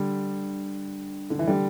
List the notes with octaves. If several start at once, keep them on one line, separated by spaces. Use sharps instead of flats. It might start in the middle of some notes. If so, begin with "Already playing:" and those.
Already playing: D3 G3
D3
E3
D3 G3